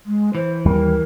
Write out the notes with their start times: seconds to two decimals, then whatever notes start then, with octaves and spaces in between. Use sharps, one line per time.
0.06 G#3
0.35 E3 C5
0.65 D#2 G3 A#4